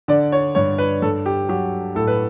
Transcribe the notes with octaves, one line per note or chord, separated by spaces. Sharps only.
D3 D5
C#5
G2 C#5
B4
G2 A4
G4
F#3 G4
A2 A4
B4